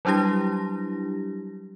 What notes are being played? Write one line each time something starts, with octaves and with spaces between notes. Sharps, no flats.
F#3 G3 D4 E4 G4 A#6